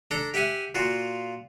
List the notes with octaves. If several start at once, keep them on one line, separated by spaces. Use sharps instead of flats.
D4 A4 A#5
G4 E5 F#5 G#5
A#2 F4 F#4